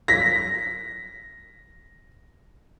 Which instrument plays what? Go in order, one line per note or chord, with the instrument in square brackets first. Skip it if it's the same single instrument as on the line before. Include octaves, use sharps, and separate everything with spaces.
[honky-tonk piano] A#6 B6